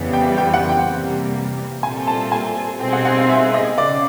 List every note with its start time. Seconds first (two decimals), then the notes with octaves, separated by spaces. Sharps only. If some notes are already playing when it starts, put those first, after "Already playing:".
Already playing: F2 C#3 E3 G3 B3
0.13 G5
0.38 G5
0.54 F#5
0.69 G5
0.86 C3 E3 G3 A#3
1.83 A#2 G3 C4 F4 A4 G#5
2.07 A5
2.32 G#5
2.80 B2 G3 C4 D#4 G#4 G5
2.93 F#5
3.05 F#5
3.18 F5
3.29 E5
3.54 D#5
3.78 C#3 D5